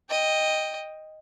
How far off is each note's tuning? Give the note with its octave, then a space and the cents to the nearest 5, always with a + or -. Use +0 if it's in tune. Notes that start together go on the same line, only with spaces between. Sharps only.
D#5 +0 G5 +15